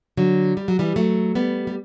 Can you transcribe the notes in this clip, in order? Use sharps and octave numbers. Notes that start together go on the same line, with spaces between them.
D3 F#3
G3
F#3
E3 G3
F#3 A3
G3 B3
G3